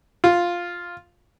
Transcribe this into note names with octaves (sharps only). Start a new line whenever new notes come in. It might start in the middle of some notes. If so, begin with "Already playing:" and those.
F4